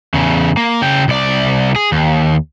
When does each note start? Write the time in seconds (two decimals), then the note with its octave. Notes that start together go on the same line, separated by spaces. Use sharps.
0.14 E2 C#3
0.57 A#3
0.82 C#3 G5
1.08 C2 D5
1.76 G#4
1.92 D#2